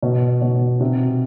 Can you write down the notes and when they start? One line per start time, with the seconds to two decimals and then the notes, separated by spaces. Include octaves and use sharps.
0.03 B2
0.42 B2
0.81 C3